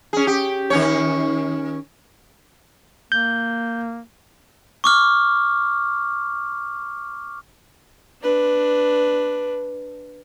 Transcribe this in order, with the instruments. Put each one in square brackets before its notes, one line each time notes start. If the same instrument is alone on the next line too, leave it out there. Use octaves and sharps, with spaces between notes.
[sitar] C#4 G#4
G4
D#3 C#4 C#5
[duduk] A#3 [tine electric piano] G6
[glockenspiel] C#6 D6 F6
[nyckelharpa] D4 B4